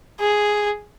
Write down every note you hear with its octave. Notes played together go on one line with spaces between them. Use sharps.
G#4